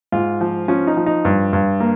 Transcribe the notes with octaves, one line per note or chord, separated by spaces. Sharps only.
G#2 F4
F3
F3 C#4
D#4
F3
D#4
G2
G2
A#3